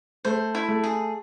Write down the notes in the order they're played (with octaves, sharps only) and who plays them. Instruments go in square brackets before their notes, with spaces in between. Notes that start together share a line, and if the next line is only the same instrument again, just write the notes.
[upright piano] A3 [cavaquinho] C5
[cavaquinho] E4
[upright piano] A3
[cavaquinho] G#4